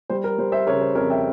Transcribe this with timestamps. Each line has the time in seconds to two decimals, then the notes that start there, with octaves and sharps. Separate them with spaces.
0.10 G3 C5
0.24 A#4
0.38 G3 C5
0.52 C5 E5
0.67 C#3 A#4 C#5
0.81 C5
0.95 F2 A#4 C#5
1.10 E5 G5